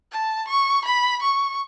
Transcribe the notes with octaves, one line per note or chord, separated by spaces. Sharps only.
A5
C#6
B5
C#6